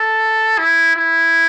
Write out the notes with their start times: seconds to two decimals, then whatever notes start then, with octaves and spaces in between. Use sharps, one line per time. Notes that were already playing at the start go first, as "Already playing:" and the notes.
Already playing: A4
0.58 E4
0.96 E4